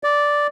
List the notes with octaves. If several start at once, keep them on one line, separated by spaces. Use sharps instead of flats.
D5